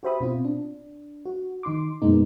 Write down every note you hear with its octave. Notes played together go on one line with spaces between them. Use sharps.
F#4 G4 C5 E5 B5 D#6
B2 C4 F4
D4
F#4
D#3 D#4 C6 D6
F#2 B2 G#3 A#3 B3 D#4